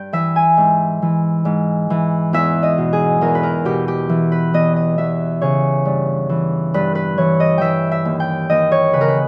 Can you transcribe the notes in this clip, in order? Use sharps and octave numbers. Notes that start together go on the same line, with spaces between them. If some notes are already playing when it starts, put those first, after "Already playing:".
Already playing: G2 G5
E3 E5
G#5
G#2
E3
G#2
E3
E2 E5
D#5
B2
G#4
E2 A#4
B4
A#4
B2 G4
G4
E3
B4
E2 D#5
D#5
E2 E5
C#3 C#5
G2
E3
G2 B4
B4
E3 C#5
D#5
E3 E5 G5
E5
D#2
G5
D#2 D#5
C#5
C#3 B4
A#4
B4